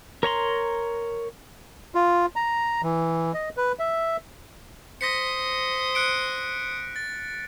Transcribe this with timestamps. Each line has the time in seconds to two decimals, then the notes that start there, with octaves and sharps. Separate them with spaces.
0.23 A#4 C#5 A#5 C6
1.95 F4
2.36 A#5
2.83 E3
3.34 D#5
3.57 B4
3.79 E5
5.01 C5 D#6 A#6 B6 C#7
5.95 F#6 C#7 D7
6.96 A6